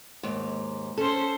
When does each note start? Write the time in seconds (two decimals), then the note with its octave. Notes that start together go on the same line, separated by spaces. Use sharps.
0.23 D#2 G#2
0.98 C#4 A4 C5